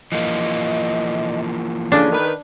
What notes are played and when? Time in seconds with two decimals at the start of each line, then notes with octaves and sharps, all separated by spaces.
0.12 E3 F3 A#3 D#5
1.92 C#3 D4 A4
2.12 D#3 B4